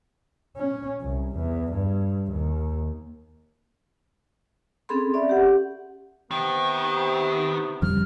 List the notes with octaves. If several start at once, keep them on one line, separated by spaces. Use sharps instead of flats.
C#4
C2
E2
G2
D#2
C4 C#4 G#4 A4 B5 C6
C#4 D5 E5
G4 F#5
C3 D#3 B3 G5
F2 C#3 G3 F6